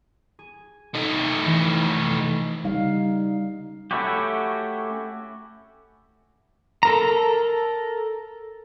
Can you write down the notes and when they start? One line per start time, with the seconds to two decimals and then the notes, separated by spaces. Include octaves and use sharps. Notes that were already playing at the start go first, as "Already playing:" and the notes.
0.39 G#4
0.95 A3 D#4
1.45 E3 F3 B6
2.64 C#3 G3 D#4 F5
3.91 A3 C#4 E4 F#4 G4
6.83 A4 A#4 A#5